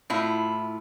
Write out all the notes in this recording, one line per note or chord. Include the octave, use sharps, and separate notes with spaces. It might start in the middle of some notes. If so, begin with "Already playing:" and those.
A2 E4 F4